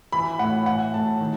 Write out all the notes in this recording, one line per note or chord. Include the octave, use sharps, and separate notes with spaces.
E3 B5
A2 F#5
E3 F#5
A2 A5
D#3